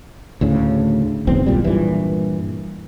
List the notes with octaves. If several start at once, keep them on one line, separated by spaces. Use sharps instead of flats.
D2 A2 C#3
D1 B1 E2 C4
D#1 B1 A#2 G3
G2 A#2 E3